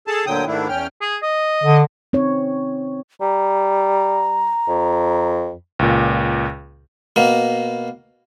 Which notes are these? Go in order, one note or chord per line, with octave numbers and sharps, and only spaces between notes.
G#4 A4 A5
D2 A#2 D3 F#3 G5 D#6
G#2 D#3 A3 D4 E4
E2 C#4 G5 F6
G#4
D#5
D3
C4 D#4 C#5
G3 A#5
F2
C#2 A#2
B2 A#3